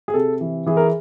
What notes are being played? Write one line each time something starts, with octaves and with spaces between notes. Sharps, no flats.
G#4
C3 A4
E3
E3 G#4
A#4